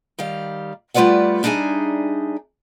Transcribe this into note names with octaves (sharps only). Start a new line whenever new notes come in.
D#3 G3 F5
G3 A3 F4 B4 D5 F#5
G3 D4 D#4 G#4 E5 G#5